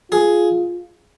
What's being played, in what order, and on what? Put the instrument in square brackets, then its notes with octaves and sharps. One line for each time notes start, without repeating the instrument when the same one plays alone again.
[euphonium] F4 [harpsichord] G#4